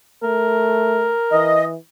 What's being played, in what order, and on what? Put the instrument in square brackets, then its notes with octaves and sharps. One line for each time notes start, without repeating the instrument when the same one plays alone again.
[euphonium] A3 [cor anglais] A#4
[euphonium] E3 [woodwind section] D#5